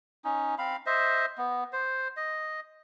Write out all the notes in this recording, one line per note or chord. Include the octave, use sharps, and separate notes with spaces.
C#4 D#4
C4 F5 B5
C5 D#5 E5
B3
C5
D#5